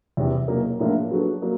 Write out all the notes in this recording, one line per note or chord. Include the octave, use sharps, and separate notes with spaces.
E2 C3 E3
B2 F#3 A#3
A2 F3 A#3 D4 F4
F#3 B3 D4 F#4 A4
F#3 A#3